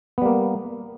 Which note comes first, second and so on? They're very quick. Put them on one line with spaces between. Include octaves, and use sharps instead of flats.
B3 G3 A#3